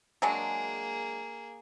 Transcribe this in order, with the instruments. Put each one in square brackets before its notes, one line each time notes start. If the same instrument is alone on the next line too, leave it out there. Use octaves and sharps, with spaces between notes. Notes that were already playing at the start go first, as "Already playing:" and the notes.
[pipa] F#3 G#3 D4 [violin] A#3 G#4